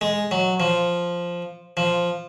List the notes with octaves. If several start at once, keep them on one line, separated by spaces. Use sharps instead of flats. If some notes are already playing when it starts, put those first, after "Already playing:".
G#3
F#3
F3
F3